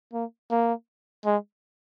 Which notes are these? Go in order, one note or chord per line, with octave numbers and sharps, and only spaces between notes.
A#3
A#3
G#3